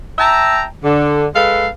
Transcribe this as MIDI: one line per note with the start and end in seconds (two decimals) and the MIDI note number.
0.19 0.63 76
0.19 0.63 79
0.19 0.63 81
0.19 0.63 82
0.84 1.26 50
1.35 1.68 56
1.35 1.68 69
1.35 1.68 71
1.35 1.68 77